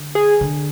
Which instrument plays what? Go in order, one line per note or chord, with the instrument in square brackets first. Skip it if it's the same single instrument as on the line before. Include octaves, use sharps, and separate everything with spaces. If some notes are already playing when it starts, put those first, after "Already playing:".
Already playing: [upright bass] D3
[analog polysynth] G#4
[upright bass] D3